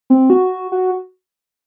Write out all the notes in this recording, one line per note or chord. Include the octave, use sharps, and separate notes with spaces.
C4
F#4
F#4